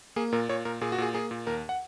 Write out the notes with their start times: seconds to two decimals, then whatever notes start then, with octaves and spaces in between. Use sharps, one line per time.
0.16 A#3 G#4
0.32 A#2 A#4
0.49 A#2 C#5
0.65 A#2 A#4
0.81 A#2 G#4
0.92 F#4
0.98 A#2 G#4
1.14 A#3 G#4
1.31 A#2
1.47 D#2 A#4
1.69 F#5